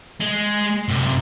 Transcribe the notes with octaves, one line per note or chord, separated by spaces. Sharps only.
G#3
F#2 C3